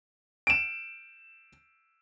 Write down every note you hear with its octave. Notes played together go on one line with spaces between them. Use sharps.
D7 E7